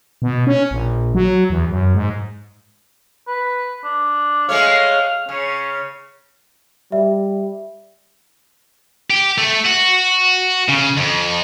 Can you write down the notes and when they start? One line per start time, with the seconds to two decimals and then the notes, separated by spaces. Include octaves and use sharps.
0.22 B2
0.47 C#4
0.71 A#1
1.15 F#3
1.50 E2
1.69 F#2
1.94 G#2
3.27 B4
3.84 D4
4.49 G#3 A3 C#5 F5
5.29 C#3 C#4
6.92 G3 E5
9.10 G4
9.38 A3
9.65 F#4
10.68 C#3
10.97 F2